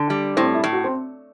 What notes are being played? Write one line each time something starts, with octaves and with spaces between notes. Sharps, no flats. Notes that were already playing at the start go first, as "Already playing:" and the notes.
Already playing: D3
G3
A2 C4
E4
A2
F#4
C4